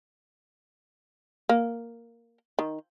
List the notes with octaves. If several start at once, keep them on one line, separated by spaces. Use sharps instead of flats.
A#3
D#3